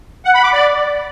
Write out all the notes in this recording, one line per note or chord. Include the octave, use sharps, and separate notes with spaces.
F#5
B5
D6
D5